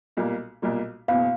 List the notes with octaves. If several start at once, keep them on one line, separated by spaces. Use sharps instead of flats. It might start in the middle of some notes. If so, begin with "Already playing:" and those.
B1 A#2 G3 A#3
B1 A#2 G3 A#3
F#1 E2 B2 F5